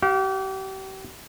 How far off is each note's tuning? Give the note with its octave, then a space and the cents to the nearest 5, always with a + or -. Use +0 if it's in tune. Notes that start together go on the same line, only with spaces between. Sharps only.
G4 -35 F5 +25